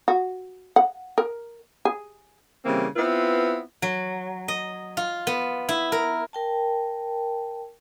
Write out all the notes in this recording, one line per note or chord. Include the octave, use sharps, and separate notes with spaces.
F#4
F#5
A#4
G#4
C#3 E3 G3 A#3 C4
B3 C4 E4 F4 B4
F#3
D#5
F4
B3
E4
A#4
A#4 G5 A5